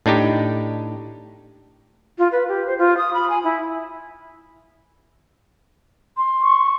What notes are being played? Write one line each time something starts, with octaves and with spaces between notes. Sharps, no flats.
A2 D4 D#4 G4
F4
B4
G4
C5
F4
D#6
B5
G#5
E4
C6
C#6